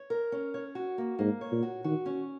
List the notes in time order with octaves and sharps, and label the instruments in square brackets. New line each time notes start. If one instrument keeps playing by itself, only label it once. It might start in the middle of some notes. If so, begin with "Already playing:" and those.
Already playing: [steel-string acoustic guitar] C#5
A#4
C#4
C#5
F#4
A#3
[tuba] G#2 [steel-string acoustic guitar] A#3
[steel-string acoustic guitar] C#5
[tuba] A#2
[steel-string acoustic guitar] F#4
[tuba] D#3 [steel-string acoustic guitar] F#4
[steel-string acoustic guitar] C#4